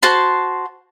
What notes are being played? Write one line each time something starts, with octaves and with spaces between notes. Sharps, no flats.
F#4 C5 A5 C6